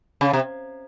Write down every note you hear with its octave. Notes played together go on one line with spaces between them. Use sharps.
C#3
C3